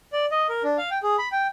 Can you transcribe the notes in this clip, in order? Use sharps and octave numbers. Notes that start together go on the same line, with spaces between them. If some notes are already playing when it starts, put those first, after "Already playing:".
D5
D#5
A#4
D4
F5
G5
G#4
B5
G5